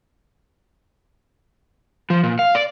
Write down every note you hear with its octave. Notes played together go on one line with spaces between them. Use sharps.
F3
A#2
F5
D5